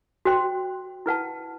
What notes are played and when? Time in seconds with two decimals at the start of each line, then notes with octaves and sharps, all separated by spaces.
0.25 F#4 C5 G5 C6
1.06 E4 B4 F#5 A5